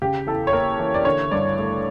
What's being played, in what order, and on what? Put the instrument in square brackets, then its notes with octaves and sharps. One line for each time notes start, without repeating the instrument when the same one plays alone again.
[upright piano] C#3 G4
E2 A4
C#5
A#3 A#4
E3
D5
D3 C#5
G2 D5
A3